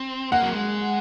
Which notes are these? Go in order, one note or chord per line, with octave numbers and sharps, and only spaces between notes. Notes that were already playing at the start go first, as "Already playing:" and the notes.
Already playing: C4
A#3 F#5
F#3
G#3